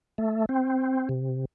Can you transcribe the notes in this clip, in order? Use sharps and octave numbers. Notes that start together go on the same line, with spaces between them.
A3
C4
C3